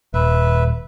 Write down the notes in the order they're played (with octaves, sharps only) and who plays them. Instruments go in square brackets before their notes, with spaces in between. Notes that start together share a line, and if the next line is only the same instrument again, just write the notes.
[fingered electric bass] D#1 [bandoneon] B4 E5